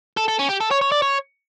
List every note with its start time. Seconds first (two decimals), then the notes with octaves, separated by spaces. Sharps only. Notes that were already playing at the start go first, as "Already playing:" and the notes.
0.17 A4
0.28 A4
0.39 C#4
0.49 G4
0.61 A4
0.71 C#5
0.81 C#5
0.92 D5
1.02 C#5